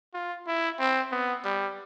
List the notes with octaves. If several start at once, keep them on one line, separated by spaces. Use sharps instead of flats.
F4
E4
C4
B3
G3